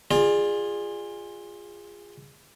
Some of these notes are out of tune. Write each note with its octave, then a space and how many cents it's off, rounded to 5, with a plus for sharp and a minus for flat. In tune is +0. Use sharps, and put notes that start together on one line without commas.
F4 +10 G#4 -15 D5 +30